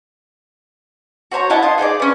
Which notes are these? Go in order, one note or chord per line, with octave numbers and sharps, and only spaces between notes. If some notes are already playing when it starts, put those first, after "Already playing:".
F#4 C5 C#5 A#5
E4 D#5 F#5 A5
F4 D#5
D#4 G#4 C5 D5
B3 C#4